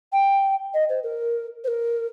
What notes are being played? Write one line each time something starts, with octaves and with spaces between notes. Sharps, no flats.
G5
D#5
C5
A#4
C5
A#4